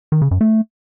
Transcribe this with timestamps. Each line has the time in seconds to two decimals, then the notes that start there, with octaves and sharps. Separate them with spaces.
0.12 D#3
0.22 C#3
0.31 F#2
0.41 A3